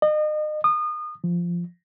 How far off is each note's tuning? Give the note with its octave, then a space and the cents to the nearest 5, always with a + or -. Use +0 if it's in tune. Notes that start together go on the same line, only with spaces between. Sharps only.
D#5 -35
D#6 -30
F3 -10